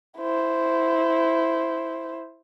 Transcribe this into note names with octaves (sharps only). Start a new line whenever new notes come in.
E4 C5